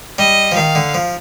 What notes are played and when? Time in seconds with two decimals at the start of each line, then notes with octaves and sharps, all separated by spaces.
0.18 G3 D#5
0.52 F3
0.57 D#3 F5
0.75 D3
0.94 F3